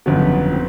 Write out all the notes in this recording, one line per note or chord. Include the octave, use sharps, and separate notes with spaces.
G1 F2 C#3 F#3 B3
C4